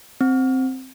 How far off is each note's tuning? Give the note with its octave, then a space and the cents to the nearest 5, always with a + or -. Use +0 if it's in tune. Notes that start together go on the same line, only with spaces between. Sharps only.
C4 +0